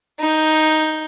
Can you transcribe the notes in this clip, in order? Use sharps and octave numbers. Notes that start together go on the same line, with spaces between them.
D#4 G6